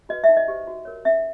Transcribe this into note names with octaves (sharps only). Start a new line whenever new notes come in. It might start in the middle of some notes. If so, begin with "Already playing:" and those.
F#4 B4 D#5
E5
D#4
D#5
G4 C5
F#4
A#4 C#5
C#4 E5